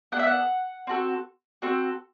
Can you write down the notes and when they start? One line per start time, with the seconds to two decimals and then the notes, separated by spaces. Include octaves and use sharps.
0.12 B3 D4 A4 F#5
0.19 E5
0.27 F#5
0.87 C4 F#4 A4
1.62 C4 F#4 A4